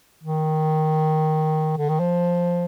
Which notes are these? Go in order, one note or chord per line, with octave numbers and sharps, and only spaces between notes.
D#3
D3
D#3
F3